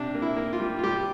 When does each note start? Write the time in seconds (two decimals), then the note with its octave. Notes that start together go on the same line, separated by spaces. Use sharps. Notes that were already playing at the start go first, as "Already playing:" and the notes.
Already playing: C3 D4
0.15 A#3
0.22 E4
0.37 A#3
0.53 F4
0.60 G3
0.79 F4
0.84 G3 G4